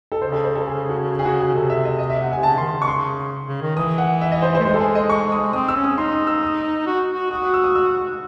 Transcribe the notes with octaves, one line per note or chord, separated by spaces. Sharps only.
A4
C#3 C5
A4
C5
A4
G#4
F#4
G#4
F#4
G#4
C3 A4
E5
D#5
D#5
E5
F#5
G#5
C3
C#3 A5
D#3 C6
C#3
C#6
C6
C#3
D#3
E3 D#6
F#5
E5
D#5
C5
C5
A3
G#3 C5
A4
G#4
D#5
C#6
D#6
C4 D#6
E6
C#4
D#6
D#4 C6
D#6
E6
D#6
F#4
F#4
F#4 D#6
D#6
E6
D#6
E6